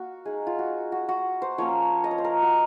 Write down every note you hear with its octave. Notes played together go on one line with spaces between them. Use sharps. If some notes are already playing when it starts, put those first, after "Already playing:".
Already playing: A#3 F#4
G#3 D#4 G#4
F4
F#4
F#4
F#4
C5
F3 A#3 C#4 C#5
D#5
C#5
C5
A#4
F#4